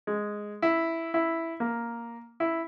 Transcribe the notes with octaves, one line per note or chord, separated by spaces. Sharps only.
G#3
E4
E4
A#3
E4